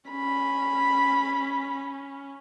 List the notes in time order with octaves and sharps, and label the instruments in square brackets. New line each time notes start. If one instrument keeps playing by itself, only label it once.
[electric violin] C#4 [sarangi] B5